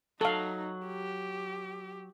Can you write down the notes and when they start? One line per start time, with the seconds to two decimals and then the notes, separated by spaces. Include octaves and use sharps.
0.21 F#3 D#4 A4 F5
0.86 G4